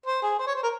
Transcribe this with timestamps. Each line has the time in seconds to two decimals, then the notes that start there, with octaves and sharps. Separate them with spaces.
0.06 C5
0.23 G#4
0.39 C5
0.47 C#5
0.55 C5
0.63 A#4